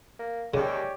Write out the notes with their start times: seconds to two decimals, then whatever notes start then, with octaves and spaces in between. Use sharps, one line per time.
0.19 A#3
0.54 D#2 C#3 G#3 G4 C#5 D5